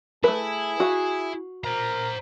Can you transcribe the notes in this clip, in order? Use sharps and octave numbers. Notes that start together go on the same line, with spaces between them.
A3 E4 G#4 B4
F#4 F5
A#4 C5 A#5